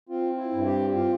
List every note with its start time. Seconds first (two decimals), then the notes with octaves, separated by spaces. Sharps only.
0.09 C4 F4
0.38 E4
0.52 G2
0.66 G4
0.94 F4